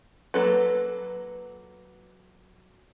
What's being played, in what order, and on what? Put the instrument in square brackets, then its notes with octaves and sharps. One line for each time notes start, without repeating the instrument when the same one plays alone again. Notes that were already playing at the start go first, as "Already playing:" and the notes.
[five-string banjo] F#3 A#3 D#4 A4 B4